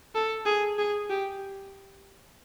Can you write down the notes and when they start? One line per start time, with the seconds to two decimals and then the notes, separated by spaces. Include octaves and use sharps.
0.15 A4
0.46 G#4
0.78 G#4
1.10 G4